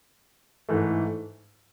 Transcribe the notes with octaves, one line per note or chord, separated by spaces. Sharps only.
G#2 E3 A3